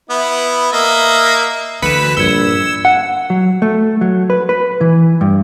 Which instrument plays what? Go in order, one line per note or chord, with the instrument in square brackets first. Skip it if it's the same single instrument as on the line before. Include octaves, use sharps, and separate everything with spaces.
[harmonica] B3 E4
A#3 D#5 E5
[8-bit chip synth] D2 B4 B6 [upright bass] E3 [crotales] C#7 E7
[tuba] A#1 [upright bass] G2 [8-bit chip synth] E6 [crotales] G#6 C#7 G7
[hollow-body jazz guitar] F#5
F#3
A3
F#3
B4
B4
E3
G2